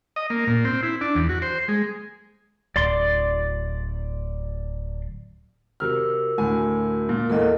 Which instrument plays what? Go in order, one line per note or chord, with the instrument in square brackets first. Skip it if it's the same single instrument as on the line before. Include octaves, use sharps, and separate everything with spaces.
[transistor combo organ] D#5
A#3
A#2
C4
E4
D4
E2
F#4
C5
G#3
[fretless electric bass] D1 [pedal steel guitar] D5 C6
[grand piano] C3 F6 [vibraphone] F#4 A#4 E6
[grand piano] D2 A2 G#5
A#2
[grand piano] E2 A#2 E3 [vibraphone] A4 A#4 D#5